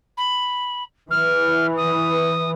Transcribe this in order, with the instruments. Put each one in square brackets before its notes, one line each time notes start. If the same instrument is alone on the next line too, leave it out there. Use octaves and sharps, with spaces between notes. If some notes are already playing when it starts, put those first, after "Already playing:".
[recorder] B5
[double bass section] E3 [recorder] F6
[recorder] D#6